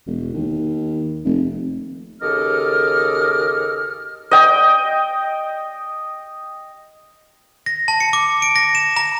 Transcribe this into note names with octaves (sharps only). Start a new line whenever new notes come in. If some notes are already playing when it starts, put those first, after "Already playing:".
E1
D#2
F1
D#2 C#3 A4 D#5 D6 F6
D#5 G5
A#6
A5
C#7
D6
D7
A#6
E7
A#5